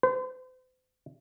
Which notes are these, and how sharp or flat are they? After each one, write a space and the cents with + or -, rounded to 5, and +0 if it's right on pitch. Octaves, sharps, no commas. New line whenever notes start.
C5 -40